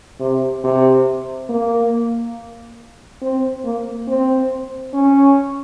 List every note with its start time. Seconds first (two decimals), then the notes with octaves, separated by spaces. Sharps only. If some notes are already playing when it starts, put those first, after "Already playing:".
0.20 C3
0.64 C3
1.50 A#3
3.22 C4
3.65 A#3
4.08 C4
4.94 C#4